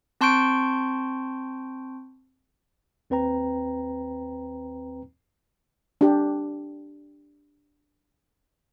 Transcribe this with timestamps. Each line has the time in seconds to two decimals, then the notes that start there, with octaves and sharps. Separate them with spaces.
0.21 C4 A5 C6 C#6 G6 D7
3.10 D#2 C4 B4 G5 A#5
6.01 D4 G4